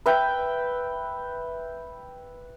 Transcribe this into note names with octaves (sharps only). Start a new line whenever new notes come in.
B4 E5 G5